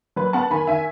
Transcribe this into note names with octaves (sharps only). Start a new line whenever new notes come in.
F#3 B4
B3 F#5 A5
D#3 G#5 B5
D#3 E5 G#5